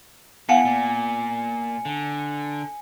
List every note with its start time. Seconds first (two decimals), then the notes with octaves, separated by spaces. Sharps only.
0.49 E3 B3 F5 F#5 G#5 C#7
0.65 A#2
1.85 D3